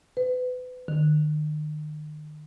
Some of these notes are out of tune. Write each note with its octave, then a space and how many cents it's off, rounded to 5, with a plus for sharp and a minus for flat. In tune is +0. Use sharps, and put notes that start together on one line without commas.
B4 +30
D#3 -40